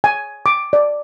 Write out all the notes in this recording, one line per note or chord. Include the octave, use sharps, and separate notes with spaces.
G#5
D6
D5